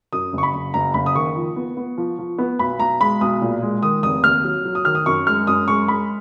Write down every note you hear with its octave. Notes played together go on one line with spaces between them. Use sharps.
F#2 D#6
F#1 C#6
B5
F#1
F#1 A#5
F#1 B5
D#6
D#3 C#6
F3
B3
B3
F3
F3
B3
B1 B5
B1 A#5
G#3 B5
B1 D#6
A#2
G#3
D#3 D#6
F1 D#6
D#2 F6
F#3
F#3
D#6
D#3 F6
D#6
F#2 C#6
G#3 F6
F#2 D#6
G#3 C#6
G#3 B5